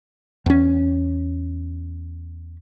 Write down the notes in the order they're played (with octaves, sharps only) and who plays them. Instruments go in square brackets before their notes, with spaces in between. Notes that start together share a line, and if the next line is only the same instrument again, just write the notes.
[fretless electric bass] E2 C#4